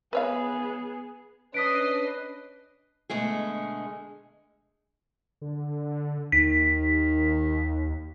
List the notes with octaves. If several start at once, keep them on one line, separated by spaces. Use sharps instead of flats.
B3 G#4 B4 C#5 F5
C#4 D4 B4 D#5 D#6 B6 C7 D7
B2 D3 G#3 A3 G#4
D3
D#2 D#3 B6